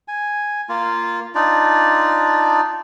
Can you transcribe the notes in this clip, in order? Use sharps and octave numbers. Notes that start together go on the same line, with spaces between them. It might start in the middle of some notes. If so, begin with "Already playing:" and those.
G#5
A#3 F4
D4 D#4 F4 D5